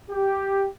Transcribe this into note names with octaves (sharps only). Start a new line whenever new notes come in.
G4